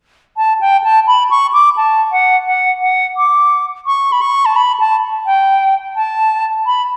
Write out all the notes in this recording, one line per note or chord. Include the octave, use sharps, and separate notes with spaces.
A5
G5
A5
B5
C#6
D6
A5
F#5
F#5
F#5
D6
C#6
B5
C#6
A5
B5
A5
G5
A5
B5